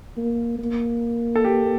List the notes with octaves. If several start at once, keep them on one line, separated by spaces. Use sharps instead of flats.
A#3
A#3
A4
G4